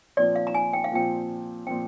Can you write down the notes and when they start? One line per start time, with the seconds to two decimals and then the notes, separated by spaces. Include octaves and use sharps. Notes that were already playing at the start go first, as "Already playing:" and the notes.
0.17 A#2 F3 C4 D5
0.36 F5
0.47 A#5
0.54 G#5
0.73 G5
0.84 F5
0.91 A#2 F3 C4 G5
1.66 A#2 F3 C4 G5